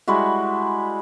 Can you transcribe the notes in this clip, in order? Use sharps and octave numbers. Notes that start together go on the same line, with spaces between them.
G3 G#3 E4 F#4